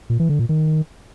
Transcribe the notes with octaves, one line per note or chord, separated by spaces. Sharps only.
A#2
E3
D3
A#2
D#3